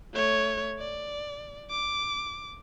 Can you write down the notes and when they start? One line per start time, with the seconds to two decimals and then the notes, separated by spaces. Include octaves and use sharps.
0.14 A3 C#5
0.80 D5
1.71 D6